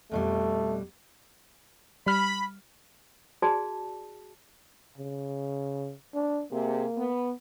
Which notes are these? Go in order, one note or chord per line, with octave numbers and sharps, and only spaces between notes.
F2 B2 G3 A3
G3 B5 F6
F#4 G#4 D5 A5
C#3
D4
C3 A#3 G#4
B3